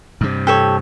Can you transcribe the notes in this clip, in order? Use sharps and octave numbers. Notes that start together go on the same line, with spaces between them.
G2 C3
G4 A4 C#5